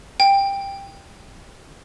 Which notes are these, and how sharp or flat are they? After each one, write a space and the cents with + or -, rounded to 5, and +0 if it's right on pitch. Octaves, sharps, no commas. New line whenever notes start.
G5 +15